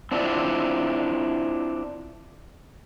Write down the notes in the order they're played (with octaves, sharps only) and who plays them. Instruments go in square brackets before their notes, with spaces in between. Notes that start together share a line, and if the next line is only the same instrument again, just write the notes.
[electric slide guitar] C4 D4 E4 F4 D5